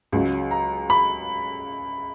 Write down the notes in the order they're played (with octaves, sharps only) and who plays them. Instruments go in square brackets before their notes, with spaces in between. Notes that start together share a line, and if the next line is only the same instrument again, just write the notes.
[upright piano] C#2 C#3 F#3
[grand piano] A#5
B5